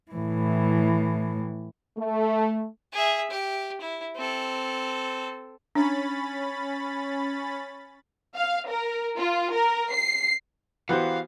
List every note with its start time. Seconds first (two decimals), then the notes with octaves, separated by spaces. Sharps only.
0.12 A2 E3
1.97 A3
2.93 G#4 E5
3.31 G4
3.81 E4
4.16 C4 A4
5.75 C#4 D4 B5 A6
8.36 F5
8.69 A#4
9.18 F4
9.54 A#4
9.93 C7
10.89 E3 B3 F#4 G4 C5 F5